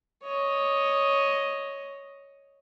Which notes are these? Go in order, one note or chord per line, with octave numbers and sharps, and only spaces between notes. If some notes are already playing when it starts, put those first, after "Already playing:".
C#5 D#5